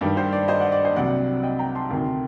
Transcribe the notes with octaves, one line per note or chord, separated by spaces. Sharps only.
G2 D#3 G3 D5
C5
D5
C5 D#5
D5 F#5
D#5
D5
C5 D#5
C2 C3 F#3 D5 F#5
D#5 G5
G5 A#5
A5 C6
D2 C3 D#3